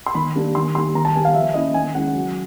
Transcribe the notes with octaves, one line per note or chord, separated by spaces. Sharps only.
C6
D#3 B5
G3 A#3 D4
D#3 C6
G3 A#3 D#4 C6
D#3 A#5
A5
G3 B3 G#5
F5
F3 E5
A#3 C#4 E4 D#5
D#3 G#5
G#3 C#4 E4 F#5
F#3